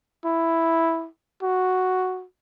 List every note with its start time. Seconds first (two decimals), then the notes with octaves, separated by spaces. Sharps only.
0.25 E4
1.42 F#4